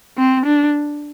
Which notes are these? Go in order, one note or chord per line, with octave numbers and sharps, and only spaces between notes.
C4
D4